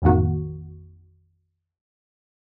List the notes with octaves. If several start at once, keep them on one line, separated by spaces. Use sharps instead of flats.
A1 F2 D#3 A#3 F#4